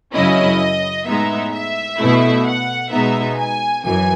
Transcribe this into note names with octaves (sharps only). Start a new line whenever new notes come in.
F#2 C#3 F#3 C#4 E4 D#5
A2 G#3 B3 D#4 E5
E5
B2 A3 E4
F#5
B2 G#3 B3 D#4 E5
G#5
F#2 E3 G#5